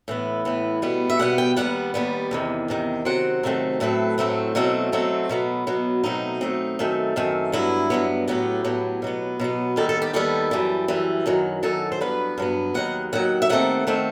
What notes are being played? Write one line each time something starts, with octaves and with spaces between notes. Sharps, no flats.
A2 E3 B3
A2 E3 B3
B2 G3 B3
E5
B2 G3 B3 F#5
G5
D#2 D#3 G3 B3 F#5
D#2 D#3 G3 B3
E2 C3 D#3
E2 C3 D#3
C3 D#3 F#3 C4 F#5
C3 D#3 F#3 A3 C4
A2 F#3 A3 C4 B4
A2 F#3 A3 C4
B2 F#3 A3 C4
B2 F#3 A3 C4
B2 F#3 B3
B2 F#3 B3
B2 F#3 A3 C4 D#4
B2 F#3 A3 C4
F#2 D#3 A3 C4
F#2 D#3 A3 C4
G2 F#3 B3 E4
G2 F#3 B3
A2 F#3 B3 G4
A2 F#3 B3
B2 F#3 B3
B2 F#3 B3
D#2 D#3 G3 B3 A4
A4
G4
D#2 D#3 G3 B3 A4
F#2 E3 G3
F#2 E3 G3
F#2 D#3 F#3
F#2 D#3 F#3 A4
C5
G2 F#3 B3 B4
G2 F#3 B3
D#2 D#3 F#3 F#5
D#2 D#3 F#3 F#5
E5
D#2 D#3 A3 C4 F#5
D#3 A3 C4